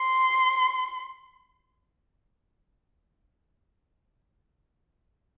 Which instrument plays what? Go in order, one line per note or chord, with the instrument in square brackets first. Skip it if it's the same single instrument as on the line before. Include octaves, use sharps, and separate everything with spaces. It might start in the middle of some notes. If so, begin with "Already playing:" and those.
Already playing: [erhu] C6